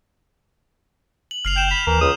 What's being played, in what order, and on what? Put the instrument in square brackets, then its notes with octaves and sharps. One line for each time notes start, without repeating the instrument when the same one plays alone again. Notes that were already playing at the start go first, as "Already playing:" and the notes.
[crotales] F#7
[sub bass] F#1 [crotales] F6 C7 F7
[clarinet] G5 [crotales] G6 E7
[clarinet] B5 [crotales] F7
[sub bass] D#2 [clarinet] E3 [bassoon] A#4
[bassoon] C#2 [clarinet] D#6